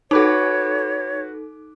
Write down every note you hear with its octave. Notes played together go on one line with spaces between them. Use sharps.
D#4 F#4 A4 B4 C#5 D6